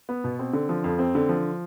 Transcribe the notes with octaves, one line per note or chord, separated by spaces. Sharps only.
B3
B2
C4
D3
F3
F2
C4
D3
F3